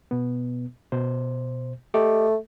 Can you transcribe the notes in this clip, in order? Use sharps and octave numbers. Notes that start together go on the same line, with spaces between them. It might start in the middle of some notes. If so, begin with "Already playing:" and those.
B2 B3
B2 C5
A3 G4 D#5 D6